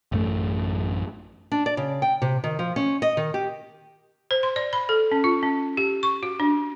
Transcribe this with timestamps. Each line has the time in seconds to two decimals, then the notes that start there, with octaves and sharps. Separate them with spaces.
0.12 A1 F#2 A3
1.52 D4
1.66 D5
1.77 C#3
2.02 G5
2.22 C3
2.44 D#3
2.59 F3
2.76 C#4
3.02 D#5
3.17 D#3
3.34 G4
4.31 C5
4.43 C6
4.56 D5
4.73 B5
4.89 A4
5.12 C#4
5.24 F4
5.43 C#4
5.77 G4
6.03 C#6
6.23 F#4
6.40 D4